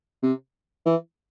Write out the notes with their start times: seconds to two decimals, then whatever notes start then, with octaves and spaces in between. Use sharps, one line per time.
0.23 C3
0.86 E3